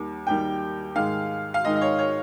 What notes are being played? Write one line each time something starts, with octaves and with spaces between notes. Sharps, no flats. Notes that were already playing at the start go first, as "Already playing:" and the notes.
Already playing: D#2 D#3 G3
D#2 D#3 G3 G5
G#2 D#3 G#3 F5
F5
G#2 D#3 G#3 D#5
D#5
C#5
C#5